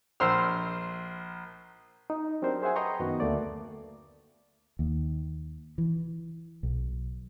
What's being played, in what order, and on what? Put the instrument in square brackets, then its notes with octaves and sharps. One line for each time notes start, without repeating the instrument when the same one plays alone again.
[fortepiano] A#1 C5 C6 E6 F6
[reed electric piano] D#4
F#3 C4 D4 G4 A#4 C5
G#4 C5 E5 F#5 G#5
B4 D#5 G5 A#5 C6 C#6
F#2 D#3 B3 F#4
D2 A3 A#3 D5
[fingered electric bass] D#2
E3
B1